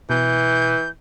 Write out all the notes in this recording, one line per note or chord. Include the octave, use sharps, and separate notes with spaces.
B2 E3 G6